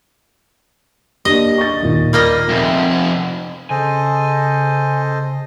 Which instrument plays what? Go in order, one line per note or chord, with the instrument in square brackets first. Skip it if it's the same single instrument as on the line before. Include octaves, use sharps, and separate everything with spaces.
[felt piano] A#3 D4 G4 [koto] D#5
[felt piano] C#6 A6
D#2 A#2
[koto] G3 A#3 D#5
[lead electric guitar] F2 C3
[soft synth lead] C#3 [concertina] A4 C5 D#5 [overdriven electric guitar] G#5